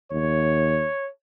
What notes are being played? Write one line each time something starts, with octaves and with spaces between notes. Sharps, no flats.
D#2 C#5